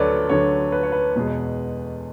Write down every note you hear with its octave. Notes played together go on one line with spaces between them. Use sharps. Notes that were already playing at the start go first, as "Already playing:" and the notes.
Already playing: D2 D3 F#3 A4 B4 C#5 D5
D2 D3 F#3 C#5
B4
C#5
B4
E2 B2 G#3